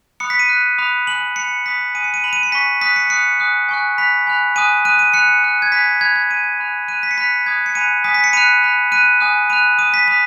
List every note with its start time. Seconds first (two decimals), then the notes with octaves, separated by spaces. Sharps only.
0.20 B5 D#6 F#6 C#7
0.30 B6
0.39 D#7
0.49 B5 F#6
0.78 B5 D#6 F#6
1.07 G#5 D#6 F#6 F#7
1.36 B5 F#6 C#7
1.66 B5 D#6 F#6 B6
1.95 G#5 D#6 F#6 D#7
2.04 C#7
2.14 D#7
2.24 B5 F#6 F#7
2.33 D#7
2.43 C#7
2.52 G#5 C#6 F#6 B6
2.81 B5 D#6 F#6 B6
2.96 C#7
3.10 B5 D#6 F#6 C#7
3.40 G#5 D#6 F#6
3.69 G#5 C#6 F#6
3.98 B5 F#6 B6
4.27 G#5 B5 F#6
4.56 G#5 D#6 F#6 D#7
4.85 B5 D#6 F#6 D#7
4.99 D#7
5.14 B5 F#6 C#7
5.43 B5 F#6
5.62 G#6
5.72 G#5 B5 D#6 F#6 B6
6.01 B5 F#6 G#6
6.16 G#6
6.30 G#5 B5 F#6 D#7
6.59 G#5 B5 F#6
6.88 B5 F#6 D#7
7.03 B6
7.11 C#7
7.18 B5 F#6 B6
7.46 B5 D#6 F#6 G#6
7.66 C#7
7.75 G#5 B5 F#6 D#7
8.04 G#5 D#6 F#6 B6
8.14 B6
8.24 C#7
8.33 B5 F#6 D#7
8.62 B5 F#6
8.92 B5 F#6 D#7
9.21 G#5 D#6 F#6
9.50 B5 F#6 D#7
9.79 B5 D#6 F#6 D#7
9.94 B6
10.08 B5 D#6 F#6 B6